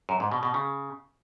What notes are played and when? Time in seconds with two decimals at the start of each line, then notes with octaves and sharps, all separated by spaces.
0.09 F#2
0.20 G#2
0.32 B2
0.43 B2
0.54 C#3